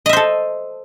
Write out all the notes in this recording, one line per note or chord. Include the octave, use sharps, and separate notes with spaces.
A4 C5 D#5 E5